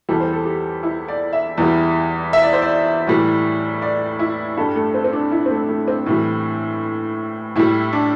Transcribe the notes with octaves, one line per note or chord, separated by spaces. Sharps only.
E2 E3 G3 A4
C5
A4
G4
E4
D5
E5
E2 E3 G3
E5
D5
C5
D5
A2 E3 G3
D5
E4
G2 G3 A4
A3
C4
C4
D4
E4
C4
A3
A3
C4
A2 E3 G3
A2 G3 E4
D4